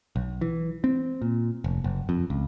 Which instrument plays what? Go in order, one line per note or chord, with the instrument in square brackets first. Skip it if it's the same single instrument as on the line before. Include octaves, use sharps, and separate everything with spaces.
[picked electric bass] B1
E3
C4
A#2
F1
F#1
F2
C#2